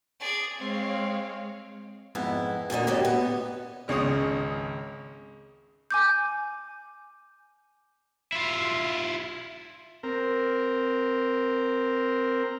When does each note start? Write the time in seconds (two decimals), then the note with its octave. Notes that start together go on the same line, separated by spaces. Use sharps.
0.20 G#4 D5
0.58 G#3 C4 C#5 F5
2.15 F2 G#2 B3 E4
2.70 D2 A#2 D3 D#4
2.87 D2 A2 F#3 G4 D#5
3.05 B3
3.88 G#1 C#2 C#3 C#5 D#6
5.91 G#5 D6 G6
8.32 E4 F4
10.03 C4 A#4